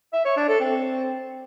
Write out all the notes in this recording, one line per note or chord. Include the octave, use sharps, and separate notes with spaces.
E5
C#5
D4
A4
C4